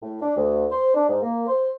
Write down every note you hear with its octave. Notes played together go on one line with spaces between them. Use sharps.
A2
D4
D2
C5
D4
G#2
A#3
C5